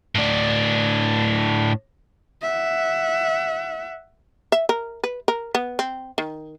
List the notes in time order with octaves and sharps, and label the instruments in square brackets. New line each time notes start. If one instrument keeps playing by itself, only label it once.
[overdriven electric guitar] A2 D4
[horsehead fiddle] E5 F#5
[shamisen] E5
A#4
B4
A#4
B3
C4
D#3